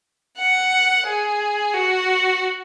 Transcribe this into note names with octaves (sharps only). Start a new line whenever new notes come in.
F#5
G#4
F#4